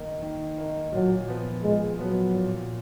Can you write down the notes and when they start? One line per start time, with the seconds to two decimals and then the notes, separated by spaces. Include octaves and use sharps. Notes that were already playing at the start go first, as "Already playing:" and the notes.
Already playing: D#3 A#3 D#4
0.22 D#3
0.58 A#3 D#4
0.93 A#2 F#3
1.28 F3 B3
1.64 A#2 G#3
1.99 F3 F#3 B3
2.35 A#2